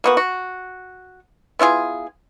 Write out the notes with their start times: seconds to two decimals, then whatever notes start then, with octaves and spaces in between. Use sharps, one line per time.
0.04 A#3 B3 F#4
0.17 F#4
1.59 B3 E4 F4 G#4